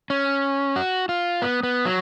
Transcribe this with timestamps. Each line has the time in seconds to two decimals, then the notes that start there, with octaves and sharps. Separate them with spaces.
0.10 C#4
0.76 F#4
1.09 F4
1.42 B3
1.63 B3
1.86 F#3